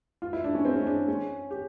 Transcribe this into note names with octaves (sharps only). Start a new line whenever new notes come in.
F4
E4
D4
C#4
C4
C#4
D4
C#4
G4